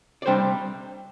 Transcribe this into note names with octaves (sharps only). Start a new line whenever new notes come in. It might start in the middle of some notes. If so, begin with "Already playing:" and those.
D5
C3 G3 D4 C5